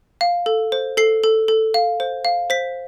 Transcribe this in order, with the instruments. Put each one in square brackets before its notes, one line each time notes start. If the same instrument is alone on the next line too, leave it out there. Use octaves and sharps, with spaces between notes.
[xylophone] F5
A4
C5
A4 C7
A4
A4
F5
C5
F5
C5 B6